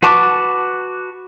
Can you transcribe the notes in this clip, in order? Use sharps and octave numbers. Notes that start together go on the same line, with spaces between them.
F#4 B4 A5 D6